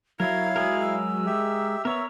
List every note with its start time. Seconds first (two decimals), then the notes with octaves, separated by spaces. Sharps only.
0.20 F#3 E4 A#4 F5 G#6
0.56 G#3 G#4 A#4
0.81 E6
1.26 G4 E5
1.85 B3 A#4 C#5 E5